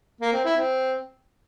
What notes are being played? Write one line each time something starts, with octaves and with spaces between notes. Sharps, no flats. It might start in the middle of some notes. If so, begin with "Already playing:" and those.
A#3
C4
E4
C4